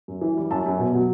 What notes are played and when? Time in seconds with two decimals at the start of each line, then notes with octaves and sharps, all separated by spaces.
0.08 F#2
0.21 E3
0.37 G3
0.50 F#2 A5
0.66 F#2
0.79 B2
0.94 F#3